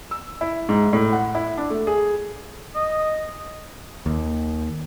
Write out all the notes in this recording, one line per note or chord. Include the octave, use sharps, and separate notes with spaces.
E6
E4
G#2
A2
F#5
E4
D4
A3
G#4
D#5
D#2